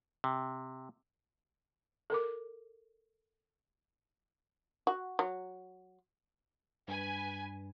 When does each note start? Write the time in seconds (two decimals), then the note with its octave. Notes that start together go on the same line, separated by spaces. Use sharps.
0.24 C3
2.10 A4 A#4 D6
4.87 F#4
5.19 F#3
6.88 G2 B4 G#5